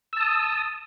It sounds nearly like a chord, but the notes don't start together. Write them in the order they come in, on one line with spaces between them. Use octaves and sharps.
E6 A5 D#6